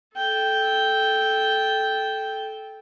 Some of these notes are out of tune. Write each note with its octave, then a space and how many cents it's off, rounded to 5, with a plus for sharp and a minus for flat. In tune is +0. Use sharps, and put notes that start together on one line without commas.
A4 -15 G5 +0